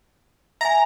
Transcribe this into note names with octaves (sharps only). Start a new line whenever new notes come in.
E5 G#5 A#5